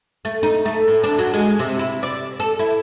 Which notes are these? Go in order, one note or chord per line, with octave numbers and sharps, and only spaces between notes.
A3
D#4
A3
A2
D4
F#3
G#3
C3
E4
D5
A4
E4